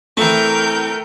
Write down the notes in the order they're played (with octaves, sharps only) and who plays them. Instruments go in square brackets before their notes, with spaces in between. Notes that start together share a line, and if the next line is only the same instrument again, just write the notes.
[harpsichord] E3 C4 [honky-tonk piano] A3 [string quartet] A#4 G5 G6